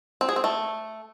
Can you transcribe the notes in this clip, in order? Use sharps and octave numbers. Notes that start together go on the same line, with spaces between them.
C4
G#4
C4
A3